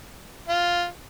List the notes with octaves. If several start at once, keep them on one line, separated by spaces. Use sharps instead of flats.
F4